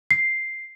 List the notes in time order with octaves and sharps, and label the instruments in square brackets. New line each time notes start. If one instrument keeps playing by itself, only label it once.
[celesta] C7